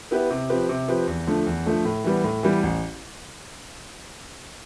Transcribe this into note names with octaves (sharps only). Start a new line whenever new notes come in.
B3 E4 G4 B4
C3
F3 C4 G4 B4
C3
F3 C4 G4 B4
E2
D3 F3 A3
E2
D3 F3 A3
A2
E3 G3 B3
A2
E3 G3 B3
A1